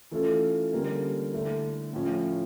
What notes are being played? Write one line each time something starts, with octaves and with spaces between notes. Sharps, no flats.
E3 A3 C#4 F4 A4
D3 G3 A#3 C#4
D3 A3 E4
A2 F3 C#4